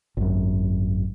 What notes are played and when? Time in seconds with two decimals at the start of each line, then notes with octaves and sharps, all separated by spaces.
0.17 G#1 F#2